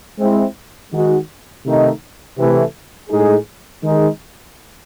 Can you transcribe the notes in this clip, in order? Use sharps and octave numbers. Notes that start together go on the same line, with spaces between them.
G#3 C4 E4
D#3 G#3 D#4 F#4
C3 D#3 A3 D#4
C3 E3 A3
A2 G#3 D#4 G#4
D#3 G#3 D#4 G#4